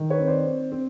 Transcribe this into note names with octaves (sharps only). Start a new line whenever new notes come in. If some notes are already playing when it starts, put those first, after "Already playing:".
Already playing: D#3
B4 C#5
C4
C5 D5
C4
C4